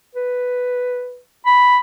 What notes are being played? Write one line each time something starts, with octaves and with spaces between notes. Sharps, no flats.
B4
B5